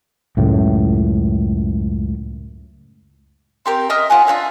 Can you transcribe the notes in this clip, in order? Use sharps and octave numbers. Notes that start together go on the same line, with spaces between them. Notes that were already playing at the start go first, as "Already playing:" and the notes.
C#2 F#2 A2
C4 G4 A#4
D#5 E5 D#6 F6
F4 C#5 F#5 G#5
D4 F4 C#5 E5